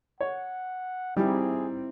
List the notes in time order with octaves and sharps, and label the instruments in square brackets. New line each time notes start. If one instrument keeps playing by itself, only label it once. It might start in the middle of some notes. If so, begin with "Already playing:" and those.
[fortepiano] C#5 [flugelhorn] F#5
[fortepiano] G3 [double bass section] C4 [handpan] D#4 E4 G4 [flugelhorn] G#4